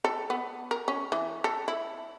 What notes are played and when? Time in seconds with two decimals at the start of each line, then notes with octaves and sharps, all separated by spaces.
0.04 A4
0.30 B3
0.71 A#4
0.88 C#4
1.12 E3
1.44 A4
1.68 E4